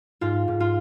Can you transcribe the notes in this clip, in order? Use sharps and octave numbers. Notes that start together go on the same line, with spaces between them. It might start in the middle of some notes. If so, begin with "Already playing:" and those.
G#2 F4
G#2
F4